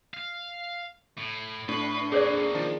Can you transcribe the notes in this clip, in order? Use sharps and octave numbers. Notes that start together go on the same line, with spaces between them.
F5
A2
A2 D4 B4
A#3 C4 G#4 C5 D5
D#3 F3 D4